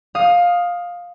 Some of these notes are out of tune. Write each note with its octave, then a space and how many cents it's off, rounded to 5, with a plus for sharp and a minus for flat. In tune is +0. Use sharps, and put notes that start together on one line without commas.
F5 +15 D#6 +0